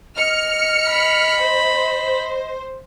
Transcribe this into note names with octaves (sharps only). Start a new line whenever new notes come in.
D#5 F6 C#7
B5
C5